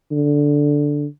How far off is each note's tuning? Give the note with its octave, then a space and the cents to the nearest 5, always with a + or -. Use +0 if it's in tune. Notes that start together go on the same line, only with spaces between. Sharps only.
D3 -5